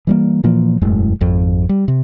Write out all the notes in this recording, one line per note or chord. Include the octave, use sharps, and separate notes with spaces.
E3 G3 A#3
A#2 E3 F3 A#3
E1 F#2 A2 G#3
G#1 F2
G3
C3